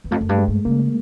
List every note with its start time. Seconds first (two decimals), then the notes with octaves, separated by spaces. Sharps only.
0.04 E2
0.11 F2 A3
0.21 F#2
0.29 G2
0.38 G#3
0.48 G2
0.65 C#3 A#3